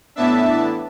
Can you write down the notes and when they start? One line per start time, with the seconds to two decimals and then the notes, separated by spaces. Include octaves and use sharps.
0.16 A2 E3 B3 D4 E5 A5